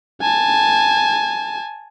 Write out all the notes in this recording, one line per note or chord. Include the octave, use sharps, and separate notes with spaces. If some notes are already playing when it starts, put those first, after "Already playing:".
G#5 A5